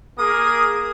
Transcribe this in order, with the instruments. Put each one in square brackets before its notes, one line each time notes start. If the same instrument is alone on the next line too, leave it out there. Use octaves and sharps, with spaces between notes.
[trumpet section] A#3 G#4 [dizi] D#6